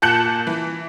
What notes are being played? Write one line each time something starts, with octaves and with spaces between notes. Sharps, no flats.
A#2 A5 F#6 G6 C#7 F#7
E3